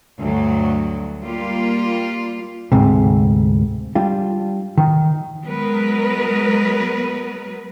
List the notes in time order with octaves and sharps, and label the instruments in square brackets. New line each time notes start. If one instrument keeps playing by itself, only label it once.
[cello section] D2 G2 F#3
G3 A#3 F4
[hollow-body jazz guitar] D2 G#2 C3
G3 D4 F4
D#3
[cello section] F#3 G#3 B3 A#4 B4